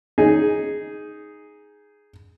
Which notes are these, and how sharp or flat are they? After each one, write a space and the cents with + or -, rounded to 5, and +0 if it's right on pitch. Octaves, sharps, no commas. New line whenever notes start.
D#4 +0 G#4 +0